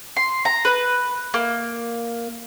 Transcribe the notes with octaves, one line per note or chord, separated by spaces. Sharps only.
C6
A#5
B4
A#3